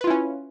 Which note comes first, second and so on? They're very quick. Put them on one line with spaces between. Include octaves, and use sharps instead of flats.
B4 F4 E4 C#4